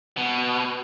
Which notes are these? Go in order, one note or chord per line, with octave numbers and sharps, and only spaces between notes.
B2